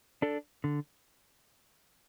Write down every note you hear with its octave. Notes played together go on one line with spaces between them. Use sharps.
D4 A4
D3